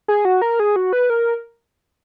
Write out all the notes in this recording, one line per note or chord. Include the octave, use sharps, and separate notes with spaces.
G#4
F#4
A#4
G#4
F#4
B4
A#4